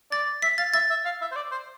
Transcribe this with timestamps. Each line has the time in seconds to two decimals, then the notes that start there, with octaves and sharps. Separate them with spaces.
0.11 D5 A6
0.42 E5 B6
0.58 F5 A6
0.74 E5 A6
0.90 E5
1.05 F5
1.21 E5
1.32 C5
1.36 D5
1.52 C5